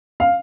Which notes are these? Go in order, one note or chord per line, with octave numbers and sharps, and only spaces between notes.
F5